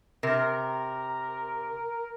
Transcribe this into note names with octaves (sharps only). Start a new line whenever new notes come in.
C3 A#4